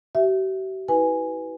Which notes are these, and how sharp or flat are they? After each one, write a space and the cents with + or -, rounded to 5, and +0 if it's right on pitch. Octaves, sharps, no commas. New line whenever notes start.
G4 -45 E5 +0
E4 -25 B4 +0 G#5 +0